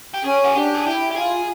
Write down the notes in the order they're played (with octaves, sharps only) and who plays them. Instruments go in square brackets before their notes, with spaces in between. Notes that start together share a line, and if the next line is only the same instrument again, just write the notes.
[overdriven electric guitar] G4
[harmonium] C#4 [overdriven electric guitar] G#4
[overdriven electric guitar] F#4
[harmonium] D4 [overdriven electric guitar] G4
[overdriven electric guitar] G#4
[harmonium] E4 [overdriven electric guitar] G4
[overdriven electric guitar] G4
[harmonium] F4 [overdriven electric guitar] G#4